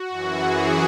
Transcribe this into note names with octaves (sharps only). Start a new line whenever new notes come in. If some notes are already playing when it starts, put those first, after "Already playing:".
Already playing: F#4
F#2 E3
G#4